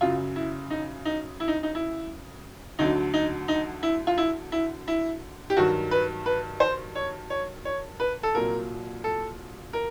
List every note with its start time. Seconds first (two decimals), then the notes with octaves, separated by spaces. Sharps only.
0.01 F#2 C#3 F#3 F4
0.36 E4
0.70 D#4
1.05 D#4
1.40 E4
1.48 D#4
1.63 D#4
1.75 E4
2.79 D2 D3 F#3 D#4
3.14 D#4
3.48 D#4
3.83 E4
4.07 F4
4.18 E4
4.52 E4
4.88 E4
5.50 G4
5.57 G2 D#3 F#3 F#4
5.91 B4
6.26 B4
6.60 C5
6.95 C#5
7.30 C#5
7.65 C#5
8.00 B4
8.23 A4
8.35 C2 A#2 F#3 A#4
9.04 A4
9.73 A#4